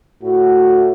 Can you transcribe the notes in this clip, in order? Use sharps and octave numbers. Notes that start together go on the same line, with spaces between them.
A2 F#4